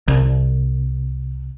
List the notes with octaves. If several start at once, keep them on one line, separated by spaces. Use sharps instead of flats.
C2